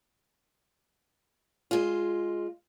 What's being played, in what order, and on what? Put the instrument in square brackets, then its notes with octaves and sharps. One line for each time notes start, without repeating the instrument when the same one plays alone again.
[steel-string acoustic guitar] G#3 F4